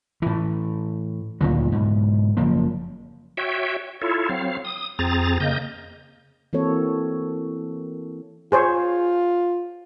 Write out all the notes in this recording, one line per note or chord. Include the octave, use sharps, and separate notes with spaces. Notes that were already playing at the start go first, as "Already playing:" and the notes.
A2 E3
D2 A#2 D#3 F#3
G#2 B2
F#1 F3 A#3
F#4 C#5 E5 G5
E4 F4 A4 C#5
F#3 C4 F5
D#6
F2 C4 G#4 A#5 A6
C#3 A#3 D#5 G6
E3 A#3 C4 F#4 A4 C#5
F4 G#4 C5 C#5